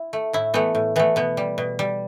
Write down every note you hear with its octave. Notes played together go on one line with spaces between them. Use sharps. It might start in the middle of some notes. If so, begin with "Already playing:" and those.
Already playing: E4
A3
A2 E4
E3 A3 B3
A2
E3 A3 B3
B2 B3
G3
B2
G3